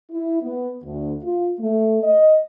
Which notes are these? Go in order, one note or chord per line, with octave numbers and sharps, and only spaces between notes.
E4
B3
D2
F4
A3
D#5